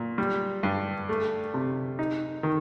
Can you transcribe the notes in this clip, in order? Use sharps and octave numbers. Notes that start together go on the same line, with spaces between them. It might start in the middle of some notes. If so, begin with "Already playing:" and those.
Already playing: A#2
G3
G2
A3
C3
D#4
D#3